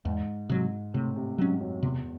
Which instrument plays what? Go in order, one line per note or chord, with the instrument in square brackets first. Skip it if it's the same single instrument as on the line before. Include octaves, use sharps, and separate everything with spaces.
[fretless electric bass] E2 [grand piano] G#2
[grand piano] G#2 [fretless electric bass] C3 F#3
[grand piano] A2 [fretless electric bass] C3
[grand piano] C3
[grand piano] G#2 [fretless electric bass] F#3
[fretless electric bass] C#4
[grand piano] F#2
[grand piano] E2 [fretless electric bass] C3